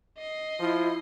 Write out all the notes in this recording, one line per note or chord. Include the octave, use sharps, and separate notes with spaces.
D#5 C7
F3 E4